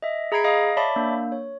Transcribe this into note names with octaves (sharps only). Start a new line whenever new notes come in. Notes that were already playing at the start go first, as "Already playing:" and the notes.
D#5 E5
G#4 A#5 B5 G#6 C7 D7
D#5 F5 D#6
C#5 D5 E5 A5 B5 D6
A#3 D4
C#5